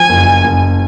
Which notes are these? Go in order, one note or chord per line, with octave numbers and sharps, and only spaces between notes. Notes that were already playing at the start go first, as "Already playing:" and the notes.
Already playing: F3 G#5
F#1
F#1